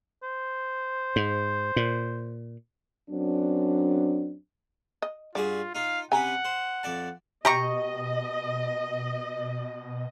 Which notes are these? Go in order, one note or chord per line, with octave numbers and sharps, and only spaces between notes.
C5
G#2
A#2
F#2 F#3 C4 D4
D#5
G2 F4 F#4 G#4 D5
D#4 F4 F5
C3 C#4 B4 F#5 G#5 A#5
C5
F2 D5 A5
B2 G4 D#5 A#5 C#6